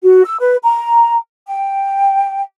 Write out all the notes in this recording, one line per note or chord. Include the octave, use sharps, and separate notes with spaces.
F#4
E6
B4
A#5
G5